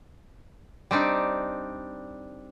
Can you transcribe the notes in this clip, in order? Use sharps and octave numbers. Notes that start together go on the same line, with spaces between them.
G3 C4 D4 D#4